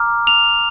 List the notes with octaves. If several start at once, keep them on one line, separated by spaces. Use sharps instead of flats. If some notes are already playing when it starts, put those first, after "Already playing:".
Already playing: A#5 D6 F6
F7